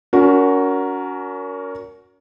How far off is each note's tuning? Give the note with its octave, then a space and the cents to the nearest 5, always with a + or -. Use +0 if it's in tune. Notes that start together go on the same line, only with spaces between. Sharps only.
C#4 +35 F#4 +0 A#4 +0